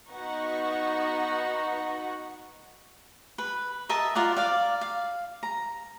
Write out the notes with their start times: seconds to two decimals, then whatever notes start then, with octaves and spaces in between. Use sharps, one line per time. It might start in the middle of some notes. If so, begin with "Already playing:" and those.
0.11 B3 D#4 F#4 F#5 C#6
3.38 B4
3.89 A#4 D#5 E5 A5
4.15 F4 A#4 D5 F#5
4.37 D5 F5
4.81 F5
5.43 A#5